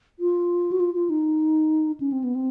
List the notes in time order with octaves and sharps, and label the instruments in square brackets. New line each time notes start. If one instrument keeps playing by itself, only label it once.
[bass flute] F4
F#4
F4
F4
D#4
C#4
C4
B3
C4